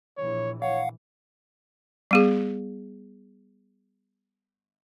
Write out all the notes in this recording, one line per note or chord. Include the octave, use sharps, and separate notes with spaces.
A#1 E3 C#5
C#5 F5 F#5
G3 B3 G#4